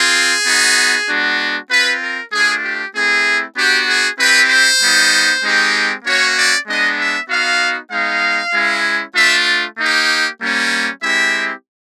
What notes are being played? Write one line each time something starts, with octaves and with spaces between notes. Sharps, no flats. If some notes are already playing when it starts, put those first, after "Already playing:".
Already playing: C4 F4 G#4
B3 D#4 F#4
G#3 B3 D4 F#4
C4 F4 B4
A#4
A3 D4 F4 G#4
G4
A3 C4 E4 G#4
B3 D4 F#4 G4
G#4
C4 E4 G4 B4
C5
G3 B3 D#4
G#3 C4 D#4 G4
A#3 C#4 F#4 C#5
D5
G#3 B3 D4 D#5
E5
B3 D#4 F#4 F5
G#3 B3 D#4 F5
G#3 C#4 E4
A3 D4 F4 E5
A#3 D#4 G4
G3 A#3 C#4
G#3 C4 E4 G4 E5